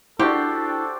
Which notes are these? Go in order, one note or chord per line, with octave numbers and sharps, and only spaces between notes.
D4 E4 F#4 G4 A4 C5